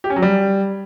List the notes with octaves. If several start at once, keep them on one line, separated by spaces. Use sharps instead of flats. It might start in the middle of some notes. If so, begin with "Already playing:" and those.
G4
C#4
F#3
G3